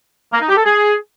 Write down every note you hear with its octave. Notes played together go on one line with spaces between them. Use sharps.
A#3
D#4
G4
A4
G#4